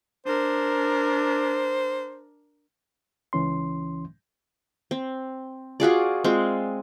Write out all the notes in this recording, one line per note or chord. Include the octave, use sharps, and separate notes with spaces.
D4 A#4 C5
C#2 E3 C#4 C6
C4
F4 F#4 G#4 D5
G#3 C4 F4